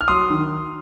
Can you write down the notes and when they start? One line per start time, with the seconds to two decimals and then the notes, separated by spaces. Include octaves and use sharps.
0.01 F6
0.08 F#3 C6 D#6
0.30 D#3